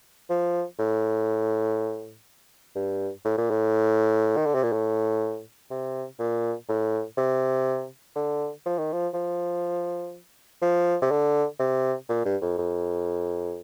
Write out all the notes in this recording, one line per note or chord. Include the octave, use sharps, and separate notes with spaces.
F3
A2
G2
A2
A#2
A2
D#3
D3
C3
A#2
A2
C3
A#2
A2
C3
D3
F3
D#3
F3
F3
F3
C3
D3
C3
A#2
G2
F2
F2